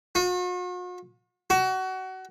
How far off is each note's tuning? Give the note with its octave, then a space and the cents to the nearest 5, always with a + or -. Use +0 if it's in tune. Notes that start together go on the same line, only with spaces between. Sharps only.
F#4 -45
F#4 +25